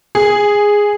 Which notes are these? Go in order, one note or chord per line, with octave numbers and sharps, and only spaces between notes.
G#4